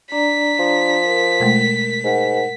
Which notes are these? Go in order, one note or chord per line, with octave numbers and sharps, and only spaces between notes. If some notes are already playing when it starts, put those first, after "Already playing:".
D4 D5 A#5 B6
F3
A#4
B2 G#3 A3
G#2 A#4 F#5